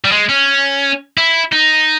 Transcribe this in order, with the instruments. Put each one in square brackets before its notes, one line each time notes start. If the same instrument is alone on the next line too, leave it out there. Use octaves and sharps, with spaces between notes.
[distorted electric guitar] G3
G#3
C#4
E4
D#4